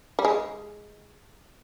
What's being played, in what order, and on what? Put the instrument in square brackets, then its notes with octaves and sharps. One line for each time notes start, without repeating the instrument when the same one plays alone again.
[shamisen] G3
G#3